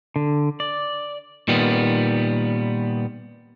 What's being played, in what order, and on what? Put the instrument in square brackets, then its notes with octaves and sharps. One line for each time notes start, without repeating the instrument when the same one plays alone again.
[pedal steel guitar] D3
D5
[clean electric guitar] A#2 D#3 G3 B3